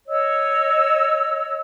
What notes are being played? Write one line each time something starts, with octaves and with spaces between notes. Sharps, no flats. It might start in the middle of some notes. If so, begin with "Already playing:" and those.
C#5 D#5 E6